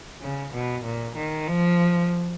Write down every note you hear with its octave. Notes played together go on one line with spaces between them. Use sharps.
C#3
B2
A#2
D#3
F3